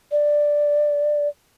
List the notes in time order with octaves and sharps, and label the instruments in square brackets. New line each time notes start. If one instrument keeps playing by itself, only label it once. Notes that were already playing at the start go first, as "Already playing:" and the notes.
[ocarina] D5